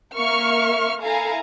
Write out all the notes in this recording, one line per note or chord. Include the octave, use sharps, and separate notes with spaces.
A#3 A#4 E5 C#6 F6
E4 A4 F5 G#5 A#5